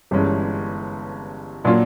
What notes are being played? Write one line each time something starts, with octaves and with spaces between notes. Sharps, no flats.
G1 G2 E3 G#3 C#4
A#2 F#3 A#3 D4 F4